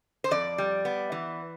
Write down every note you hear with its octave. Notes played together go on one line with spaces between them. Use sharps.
C5
F2 D5
G3
B3
E3